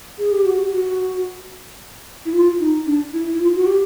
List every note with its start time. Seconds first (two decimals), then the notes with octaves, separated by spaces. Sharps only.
0.19 G#4
0.32 G4
0.45 F#4
0.59 G4
0.72 F#4
2.25 E4
2.33 F4
2.60 D#4
2.86 D4
3.13 E4
3.34 E4
3.40 F4
3.55 F#4
3.66 G4